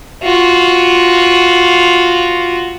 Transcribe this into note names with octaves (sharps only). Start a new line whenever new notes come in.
F4 F#4